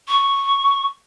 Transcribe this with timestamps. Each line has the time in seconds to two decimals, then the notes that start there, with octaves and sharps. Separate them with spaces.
0.08 C#6